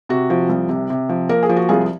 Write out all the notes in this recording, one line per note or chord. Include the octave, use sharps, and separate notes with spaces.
C3 F#4
F3
C2
C3
C3
F3
A#3 A#4
G#4
F3
F#4
C2 F4 G#4